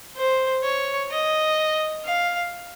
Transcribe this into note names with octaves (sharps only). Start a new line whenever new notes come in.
C5
C#5
D#5
F5